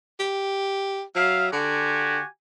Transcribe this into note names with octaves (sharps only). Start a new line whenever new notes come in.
G4
F#3 E5 F5
D3 F#4 G4 G#5